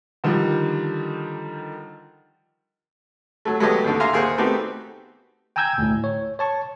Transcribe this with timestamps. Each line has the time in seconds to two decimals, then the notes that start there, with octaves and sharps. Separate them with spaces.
0.24 D3 D#3 F3 G3
3.45 F#3 A3
3.60 F#3 G#3 A3 B3 G4 D#5
3.84 D#2 D3
4.00 E5 F5 G#5 A#5 C6
4.13 D#2 G#4 A#4 C5 F#5
4.38 A3 B3 C4 D#4 F#4 G4
5.56 G5 G#5 A#5 E6 G6 G#6
5.78 D2 A2
6.04 C#5
6.39 C#5 A5 C#6